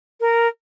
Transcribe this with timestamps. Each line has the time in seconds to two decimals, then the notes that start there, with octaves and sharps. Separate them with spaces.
0.20 A#4